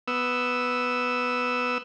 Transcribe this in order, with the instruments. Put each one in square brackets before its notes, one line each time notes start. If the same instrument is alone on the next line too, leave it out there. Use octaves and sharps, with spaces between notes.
[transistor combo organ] B3 E6